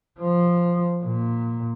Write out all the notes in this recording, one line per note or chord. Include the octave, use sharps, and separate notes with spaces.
F3
A#2